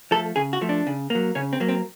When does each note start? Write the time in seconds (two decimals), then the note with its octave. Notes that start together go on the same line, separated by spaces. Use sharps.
0.11 F3 A3 A4
0.36 C#3 G#4
0.53 F#4
0.61 F3 A3
0.69 D4
0.87 C#3
1.10 F#3 A#3
1.35 C#3 C#4
1.53 C4
1.60 F#3 A#3
1.69 C4